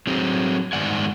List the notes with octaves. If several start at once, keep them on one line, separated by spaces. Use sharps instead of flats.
F#3 C4 G#4
G#2 D#3 B3 D5 F#5 G#5